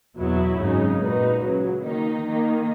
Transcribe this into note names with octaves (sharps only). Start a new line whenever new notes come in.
E2 B2 F#3 B3 E4
G#1 F#2 C#3 G#3 D#4
A#2 G#3 D#4 F#4 B4
C#2 C#3 F#3
D#3 A#3 D#4
D#3 A#3 D#4